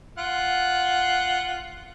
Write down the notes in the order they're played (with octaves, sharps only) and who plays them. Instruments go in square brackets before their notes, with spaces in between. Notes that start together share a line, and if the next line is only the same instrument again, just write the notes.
[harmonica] F4 F#5